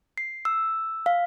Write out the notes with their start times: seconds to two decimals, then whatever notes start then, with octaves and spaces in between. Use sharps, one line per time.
0.18 C7
0.45 E6
1.06 F5